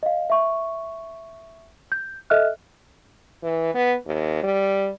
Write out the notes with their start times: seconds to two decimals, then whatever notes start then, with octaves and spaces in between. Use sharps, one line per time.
0.03 D#5 F5
0.30 E5 C#6
1.92 G6
2.30 A4 D#5 E5 F6 F#6
3.43 E3
3.74 B3
4.06 D#2
4.43 G3